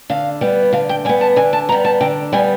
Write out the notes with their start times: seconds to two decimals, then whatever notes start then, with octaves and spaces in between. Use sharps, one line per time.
0.10 D3 F5
0.41 G3 B3
0.72 D3 F5
0.89 G5
1.05 G3 G#5
1.09 B3
1.21 A5
1.36 D3 G#5
1.53 A5
1.69 B3 A#5
1.72 G3
1.85 A5
2.01 D3 G5
2.33 G3 B3 G#5